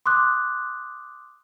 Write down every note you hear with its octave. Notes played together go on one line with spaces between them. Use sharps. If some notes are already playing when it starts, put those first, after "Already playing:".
C6 D6 D#6 F#6